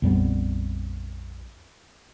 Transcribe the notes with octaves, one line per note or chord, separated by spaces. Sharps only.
A#1 F2 G3 B3